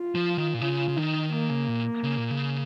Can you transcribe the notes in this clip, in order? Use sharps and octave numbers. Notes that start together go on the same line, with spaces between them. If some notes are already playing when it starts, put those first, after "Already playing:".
Already playing: F4
F3
D#3
A#2
C#3 F4
C#3
D#3 D#4
D#3 A#3
C#3
A#2
C#3
A#2
C#3